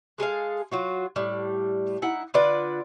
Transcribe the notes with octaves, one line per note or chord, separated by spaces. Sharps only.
G#3 G#4 A4 F5
F#3 F4 F#4
A2 G3
D#4 E4 F#5
D3 F4 B4 D5